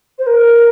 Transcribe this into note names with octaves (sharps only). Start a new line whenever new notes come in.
C5
A#4